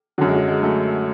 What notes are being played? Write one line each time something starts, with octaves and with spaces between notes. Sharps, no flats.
F#2 D3 F#3
G#3
F#3
G#3
F#3 A3